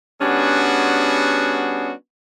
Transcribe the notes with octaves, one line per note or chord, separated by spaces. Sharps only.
G3 B3 C#4 D4 F#4 G#4